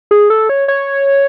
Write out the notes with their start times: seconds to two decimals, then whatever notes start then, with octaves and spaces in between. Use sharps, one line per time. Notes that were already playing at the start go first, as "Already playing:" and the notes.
0.11 G#4
0.30 A4
0.49 C#5
0.68 C#5